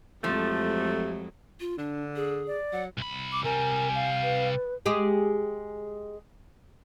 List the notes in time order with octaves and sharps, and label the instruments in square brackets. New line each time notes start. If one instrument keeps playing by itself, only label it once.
[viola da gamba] F2 F#3 G#3 [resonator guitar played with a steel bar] F3 [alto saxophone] A3 [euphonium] G4
[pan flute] F4
[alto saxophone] D3 [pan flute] D4
[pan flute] G#4
[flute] D5
[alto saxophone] F#3 [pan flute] F#5
[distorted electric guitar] C2 B5
[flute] D6
[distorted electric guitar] C3 G3 [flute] A#4 [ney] G#5
[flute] F5
[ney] B4
[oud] G#3 G4 G#4